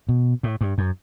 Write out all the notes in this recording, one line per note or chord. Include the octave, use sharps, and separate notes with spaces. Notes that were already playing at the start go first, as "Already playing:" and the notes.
B2
A2
G2
F#2